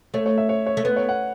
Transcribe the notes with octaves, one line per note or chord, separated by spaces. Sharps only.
A3 C#5
C#5
E5
C#5
C#5
A3
B3 B4
C#5
F#5